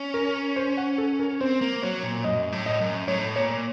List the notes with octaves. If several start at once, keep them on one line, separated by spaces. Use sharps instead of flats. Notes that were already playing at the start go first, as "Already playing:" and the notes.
Already playing: C#4
A#4
C5
F#5
A4
A#4
C4 C5
A#3
F#3 C#5
A#2
F#2 D#5
A2
D#5
F#2
A2 C#5
A#2 C#5